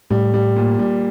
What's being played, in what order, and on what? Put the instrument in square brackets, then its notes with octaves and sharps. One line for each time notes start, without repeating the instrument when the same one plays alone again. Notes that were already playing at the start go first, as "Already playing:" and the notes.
[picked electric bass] A2 [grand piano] G3
[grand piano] G3
A#2
G3